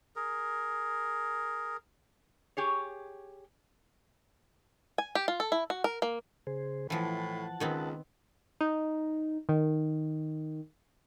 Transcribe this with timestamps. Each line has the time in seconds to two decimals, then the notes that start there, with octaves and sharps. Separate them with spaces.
0.16 G#4 A#4
2.57 G4 G#4 C#5
4.98 G#5
5.15 G4
5.28 F4
5.40 A4
5.52 E4
5.70 F#4
5.84 A#4
6.02 A#3
6.47 C#3 G#4 C5
6.90 A2 E3 F3 F#5 A5
7.60 C#2 D#3 B3 C4
8.61 D#4
9.49 D#3